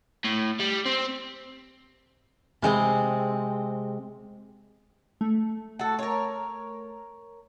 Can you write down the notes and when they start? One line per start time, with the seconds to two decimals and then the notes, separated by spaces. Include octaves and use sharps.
0.24 A2
0.60 G3
0.85 C4
2.62 C3 G#3 C4
5.21 A3
5.79 F#4 A4
5.99 A#4 C#5